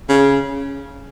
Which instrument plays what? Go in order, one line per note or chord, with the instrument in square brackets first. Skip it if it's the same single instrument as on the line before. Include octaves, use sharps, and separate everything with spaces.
[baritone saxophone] C#3